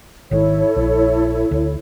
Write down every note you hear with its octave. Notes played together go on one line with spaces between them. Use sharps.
G#1 D#3 E4 A4 C#5
A#1
D2